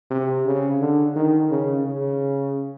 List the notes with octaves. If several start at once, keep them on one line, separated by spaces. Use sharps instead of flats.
C3
C#3
D3
D#3
C#3
C#3